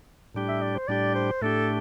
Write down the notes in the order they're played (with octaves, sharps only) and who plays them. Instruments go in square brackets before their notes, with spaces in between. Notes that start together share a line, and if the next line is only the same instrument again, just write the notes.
[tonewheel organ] A2 G3 D4 G4
[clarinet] E5
D5
C5
[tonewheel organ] A2 G3 D4 G4 [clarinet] D5
[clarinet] C5
[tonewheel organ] A2 A3 D4 G4 [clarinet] A4